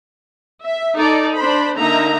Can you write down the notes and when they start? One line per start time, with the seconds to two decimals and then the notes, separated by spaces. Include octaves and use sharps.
0.64 E5
0.96 D#4 A4 D5
1.36 D4 C5 B5
1.77 D3 A#3 D#4 E5 A#5